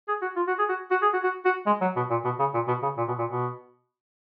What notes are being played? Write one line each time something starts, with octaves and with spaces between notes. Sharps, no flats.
G#4
F#4
F4
F#4
G#4
F#4
F#4
G#4
F#4
F#4
F#4
G#3
F#3
B2
A#2
B2
C#3
A#2
B2
C#3
A#2
B2
A#2
B2